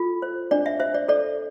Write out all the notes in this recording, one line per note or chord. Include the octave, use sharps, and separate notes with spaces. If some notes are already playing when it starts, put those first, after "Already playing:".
Already playing: F4 A4
C5
D4 D5
E5
C5 E5
D5
A4 D5